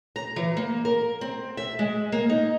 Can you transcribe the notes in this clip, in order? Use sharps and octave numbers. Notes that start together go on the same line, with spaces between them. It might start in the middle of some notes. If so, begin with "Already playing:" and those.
A#5
E3
A#3
A#4
C4
E5
G#3
A#3
D#4